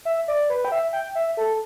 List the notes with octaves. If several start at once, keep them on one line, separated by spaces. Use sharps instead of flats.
E5
D5
B4
G5
E5
G5
E5
A4